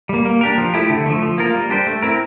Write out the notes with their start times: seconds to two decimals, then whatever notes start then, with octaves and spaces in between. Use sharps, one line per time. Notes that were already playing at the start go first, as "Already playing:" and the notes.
0.09 G3 A#3
0.25 A#3
0.41 D4 G4 A#4
0.58 F3
0.74 A3 E4 G4
0.90 D3
1.06 F3 A3
1.23 F3
1.38 A#3 F4 A#4
1.55 G3
1.70 D4 G4 C5
1.87 A3
2.02 C4 E4 A#4